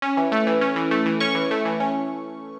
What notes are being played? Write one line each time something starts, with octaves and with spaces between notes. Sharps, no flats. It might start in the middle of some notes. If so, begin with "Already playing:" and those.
C#4
E3
A3
E3
C#4
E3
A3
E3
C#4 C#6
E3
A3
E3
C#4